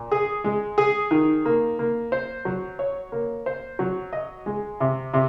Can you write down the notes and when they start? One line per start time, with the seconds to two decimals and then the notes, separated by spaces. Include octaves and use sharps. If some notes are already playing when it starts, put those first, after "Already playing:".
Already playing: A#2
0.11 G#4
0.44 G#3
0.78 G#4
1.11 D#3
1.46 A#3
1.79 A#3
2.12 C5
2.45 F#3
2.79 C#5
3.12 A#3
3.46 C5
3.79 F#3
4.13 D#5
4.46 G#3
4.80 C3
5.14 C3